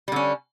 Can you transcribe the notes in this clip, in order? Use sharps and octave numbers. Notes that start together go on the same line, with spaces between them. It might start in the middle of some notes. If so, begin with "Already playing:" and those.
D3 G3 C#4